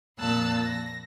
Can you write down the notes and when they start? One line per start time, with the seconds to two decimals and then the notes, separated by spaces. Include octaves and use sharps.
0.17 F2 A#2 A#3 A5 E6 F#6
0.62 A#6